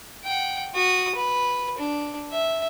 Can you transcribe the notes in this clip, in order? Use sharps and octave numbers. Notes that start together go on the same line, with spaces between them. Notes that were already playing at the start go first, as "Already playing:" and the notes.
F#5 G5
F#4 D#6
B4
D4
E5